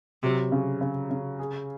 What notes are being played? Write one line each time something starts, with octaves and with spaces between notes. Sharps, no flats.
C3 F#3
C#3
C#3
C#3
G#4